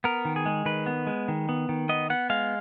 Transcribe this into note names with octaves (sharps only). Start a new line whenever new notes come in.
B3 A#4
D#3
G#4
G#3
D#3 B4
B3
G#3
D#3
B3
D#3
B3 D#5
B3 F#5
G#3 F5